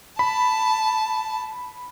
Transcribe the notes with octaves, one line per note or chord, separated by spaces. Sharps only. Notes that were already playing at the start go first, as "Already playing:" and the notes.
A5 B5